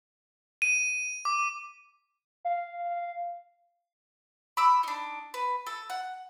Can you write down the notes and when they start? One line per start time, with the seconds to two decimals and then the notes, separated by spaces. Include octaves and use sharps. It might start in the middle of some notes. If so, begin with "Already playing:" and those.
0.62 D#7
1.25 D6
2.45 F5
4.57 B5 D6 E6
4.83 D4 D#4
5.34 B4
5.66 A4
5.90 F#5